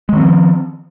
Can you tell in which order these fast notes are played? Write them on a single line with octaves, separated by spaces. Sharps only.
G#3 D#3 C4 F3